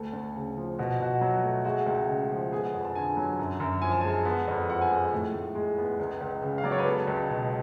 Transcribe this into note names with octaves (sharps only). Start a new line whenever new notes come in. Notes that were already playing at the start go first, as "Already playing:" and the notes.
Already playing: D2 A4
D2
C#3
F3
B2 F#4
B2 F#4
F#3
A3
G#3 F#4
C#2
C#3
F3
B3 G#4
F#5
F2 G#5
A5
D3 G#5
F#3
F#2
F#2
F3 G#5
A5
G#3 G#5
B3
F2
F3 F#5
G#5
G#3 F#5
A2
A2
G#3
B3
C#2
C#2
C#3
F5
F#3 D5
C#5
B4
B3 A4
C#2
B2